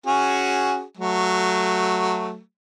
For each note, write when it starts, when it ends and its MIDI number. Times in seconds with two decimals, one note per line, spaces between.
0.06 0.83 61
0.06 0.83 66
0.06 0.83 68
0.97 2.40 54
0.97 2.40 57